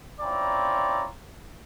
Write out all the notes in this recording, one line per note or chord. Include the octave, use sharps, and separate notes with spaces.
C4 C#4 E4 F4 D5 A#5